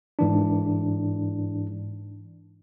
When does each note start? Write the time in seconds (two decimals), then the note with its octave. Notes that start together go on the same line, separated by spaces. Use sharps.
0.19 G#2 E3 D4